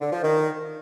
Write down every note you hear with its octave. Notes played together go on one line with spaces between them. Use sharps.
D3
F3
D#3